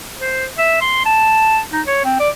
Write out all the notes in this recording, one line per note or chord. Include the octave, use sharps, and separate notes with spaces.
C5
E5
C6
A5
D#4
C#5
C4
D5